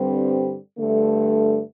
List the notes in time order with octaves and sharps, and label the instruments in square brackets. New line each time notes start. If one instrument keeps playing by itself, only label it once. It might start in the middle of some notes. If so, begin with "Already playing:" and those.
Already playing: [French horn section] G2 D3 G3 C4
G2 D3 A3